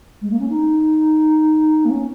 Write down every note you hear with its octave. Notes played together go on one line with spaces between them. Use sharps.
G#3
A#3
C#4
D#4
A#3
C#4